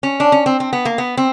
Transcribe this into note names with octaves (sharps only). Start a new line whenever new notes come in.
C#4
D4
C#4
C4
C4
B3
A#3
B3
C4